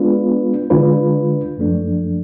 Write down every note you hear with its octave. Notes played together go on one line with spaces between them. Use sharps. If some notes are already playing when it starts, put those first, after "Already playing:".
Already playing: G#3 B3 D4 F4 B4
D3 G#3 D4 F4 B4
F#2 F3 A3 D4